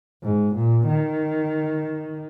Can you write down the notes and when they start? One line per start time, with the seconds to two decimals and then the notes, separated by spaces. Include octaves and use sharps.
0.23 G#2
0.55 A#2
0.87 D#3